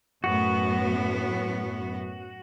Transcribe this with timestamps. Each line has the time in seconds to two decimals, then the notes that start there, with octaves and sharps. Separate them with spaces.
0.24 F#2 A2 B3 F#4